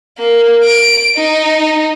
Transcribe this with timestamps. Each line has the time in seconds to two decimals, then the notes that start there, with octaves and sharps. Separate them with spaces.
0.18 A#3
0.65 D7
1.17 D#4